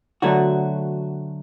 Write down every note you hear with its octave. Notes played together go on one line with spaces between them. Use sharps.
D3 F#3 A3 F#4